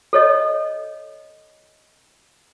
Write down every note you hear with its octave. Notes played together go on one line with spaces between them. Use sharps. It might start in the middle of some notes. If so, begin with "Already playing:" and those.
A4 C#5 D#5